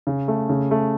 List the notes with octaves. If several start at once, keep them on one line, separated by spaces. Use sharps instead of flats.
C#3
A3
C#3
A3